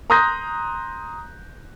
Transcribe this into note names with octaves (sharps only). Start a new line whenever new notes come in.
A#5 C6 D#6 F#6 G6 A#6